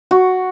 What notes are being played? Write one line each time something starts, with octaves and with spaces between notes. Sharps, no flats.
F#4